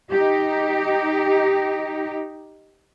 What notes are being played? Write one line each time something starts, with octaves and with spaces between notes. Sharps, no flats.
D#4 G4